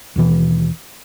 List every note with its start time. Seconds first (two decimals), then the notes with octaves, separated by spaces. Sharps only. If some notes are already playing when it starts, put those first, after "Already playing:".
0.16 D#2 B2 E3